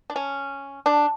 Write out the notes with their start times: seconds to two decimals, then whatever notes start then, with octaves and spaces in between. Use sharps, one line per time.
0.10 D4
0.16 C#4
0.86 D4